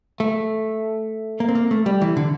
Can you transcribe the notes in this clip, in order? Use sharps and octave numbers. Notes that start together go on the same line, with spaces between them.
A3
A#3
C4
A#3
A3
G3
E3
D3